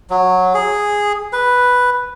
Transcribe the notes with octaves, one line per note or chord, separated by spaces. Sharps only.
F#3
G#4
B4